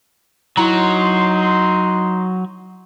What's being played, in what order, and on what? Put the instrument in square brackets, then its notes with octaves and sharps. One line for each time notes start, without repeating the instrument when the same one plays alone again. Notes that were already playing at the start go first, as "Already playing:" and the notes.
[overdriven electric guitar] F#3 [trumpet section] D#4 C6 [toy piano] E4 G5 A#5